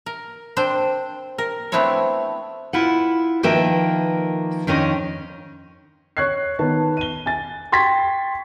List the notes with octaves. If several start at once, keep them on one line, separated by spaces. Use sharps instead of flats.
A#4
C4 D4 C5
A#4
A3 B3 C4 D4 E4 C#5
E4 F4 F#5
D#3 F3 A#3 B4 E5 G5
F2 D#3 C#4 D4 D#5
C#5 C#6 F#6 G#6 C7
D#3 B3 B4 A5
D#7 G7
G#5 A6
G5 C6 C#6 G#6 A6 B6